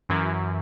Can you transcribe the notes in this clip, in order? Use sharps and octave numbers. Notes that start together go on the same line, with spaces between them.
F#2 E3